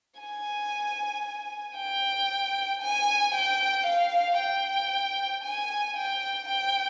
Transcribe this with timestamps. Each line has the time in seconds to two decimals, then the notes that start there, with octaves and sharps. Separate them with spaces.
0.20 G#5
1.77 G5
2.82 G#5
3.34 G5
3.86 F5
4.39 G5
5.43 G#5
5.96 G5
6.48 G5